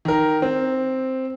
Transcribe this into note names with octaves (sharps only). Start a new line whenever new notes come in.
D#3 A#4
C4